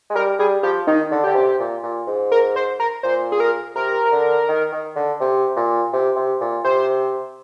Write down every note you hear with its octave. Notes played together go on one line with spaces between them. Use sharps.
G#3
G3 A#4
G3 G#4
F3 G4
D#3 D#4
D3
D3 G4
C3
A#2
A#2
G#2
A#4
C5
A#4
A#2 C5
G#4
A#4
C3 A#4
D3
D#3
D#3
D3
C3
A#2
C3
C3
A#2
C3 C5